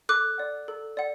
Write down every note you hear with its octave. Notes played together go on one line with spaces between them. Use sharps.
A4 D6 F#6
D5 F#5
A4
D5 F#5